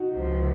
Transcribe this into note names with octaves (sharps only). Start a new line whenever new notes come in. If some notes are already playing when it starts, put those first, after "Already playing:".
Already playing: D#4 F#4
C#2 C3 F3